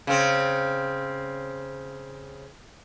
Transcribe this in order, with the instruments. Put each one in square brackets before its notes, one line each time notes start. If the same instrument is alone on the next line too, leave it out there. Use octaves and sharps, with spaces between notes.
[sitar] C#3 C4